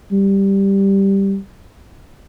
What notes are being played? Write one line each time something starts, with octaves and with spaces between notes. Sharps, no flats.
G3